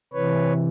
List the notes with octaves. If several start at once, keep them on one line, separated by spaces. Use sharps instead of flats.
C3 E3 B4 C#5